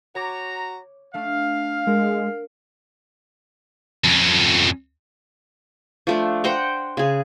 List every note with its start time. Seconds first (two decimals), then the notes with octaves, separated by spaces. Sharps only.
0.15 F#4 C#5 A#5 D6 G6
1.14 A3 D4 F5
1.87 G#3 A#4
4.04 F2 C#4
6.07 F3 A3 D4
6.44 C5 F#5 G5 A#5
6.97 C#3 G#4